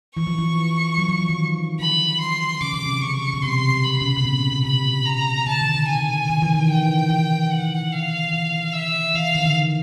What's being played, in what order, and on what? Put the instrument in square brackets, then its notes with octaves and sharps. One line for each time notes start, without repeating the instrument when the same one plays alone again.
[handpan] E3 [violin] C#6
[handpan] F3
E3
F#3
F3
E3
D#3
[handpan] D3 [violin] B5
[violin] C6
[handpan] C#3 [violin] D6
[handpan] C3
C#3
[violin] C#6
[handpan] B2
[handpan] C3 [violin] C6
[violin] B5
[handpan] C#3
C3
B2
A#2
B2
C3
[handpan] C#3 [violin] B5
[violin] A#5
[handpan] D3 [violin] A5
[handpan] D#3
D3
[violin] G#5
[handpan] D#3
E3
D#3
[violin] G5
[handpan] E3
[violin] F#5
F5
[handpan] E3
[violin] E5
[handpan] E3 [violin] F5
[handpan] D#3
D3